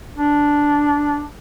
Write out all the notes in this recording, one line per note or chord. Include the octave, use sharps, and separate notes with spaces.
D4